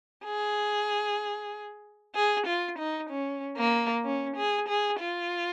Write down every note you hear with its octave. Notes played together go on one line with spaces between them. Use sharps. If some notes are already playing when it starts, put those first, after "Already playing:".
G#4
G#4
F4
D#4
C#4
A#3
C#4
G#4
G#4
F4